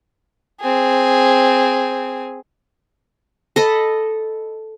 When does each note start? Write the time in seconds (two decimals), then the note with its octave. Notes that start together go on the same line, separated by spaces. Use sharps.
0.62 C4 G#4
3.56 A4 D#5 B5